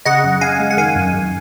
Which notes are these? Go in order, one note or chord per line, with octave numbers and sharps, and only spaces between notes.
C#3 D#5 F#5
F#2
F#2 F5 G#5
G#3
F#5
D#3 F5 G#5
F#2
F#2